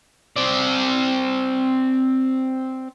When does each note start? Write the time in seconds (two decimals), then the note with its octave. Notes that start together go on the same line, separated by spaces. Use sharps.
0.36 C4 D5